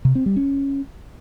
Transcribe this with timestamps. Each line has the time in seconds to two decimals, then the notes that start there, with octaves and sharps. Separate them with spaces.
0.05 C3
0.15 C4
0.26 G3
0.36 C#4